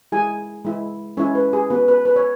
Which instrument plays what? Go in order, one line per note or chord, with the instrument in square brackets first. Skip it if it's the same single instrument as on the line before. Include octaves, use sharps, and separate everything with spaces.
[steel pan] G#3 E4 G#4 G#5
G#3 E4
G#3 C#4 E4 C#5
B4
G#4
B3 F#4 B4
B4
B4
C#5